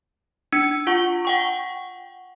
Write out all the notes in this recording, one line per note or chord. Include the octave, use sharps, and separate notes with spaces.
D4 E6 G#6 C#7
F4 F#5 C#6
F#5 G5 C#6